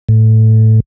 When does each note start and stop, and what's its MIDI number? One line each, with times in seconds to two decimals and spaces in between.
0.09 0.80 45